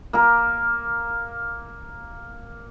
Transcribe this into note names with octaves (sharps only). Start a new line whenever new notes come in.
A#3 A#4